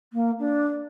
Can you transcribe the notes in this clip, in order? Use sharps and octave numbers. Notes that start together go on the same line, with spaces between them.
A#3
D4